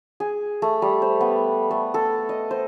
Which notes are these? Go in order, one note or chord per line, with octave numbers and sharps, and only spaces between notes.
G#4
A3
G3
C5
B3
A3
A4
D#5
C5